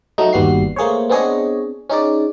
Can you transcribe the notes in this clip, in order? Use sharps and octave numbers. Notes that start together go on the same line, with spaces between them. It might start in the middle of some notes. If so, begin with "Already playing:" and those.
F#3 A3 D#4
G1 D#2 G3 B3 F#4 C7
A3 A#3 G#4 C5 C#5
B3 C4 D4 G#4 C#5 D#5
C#4 D#4 G#4 D5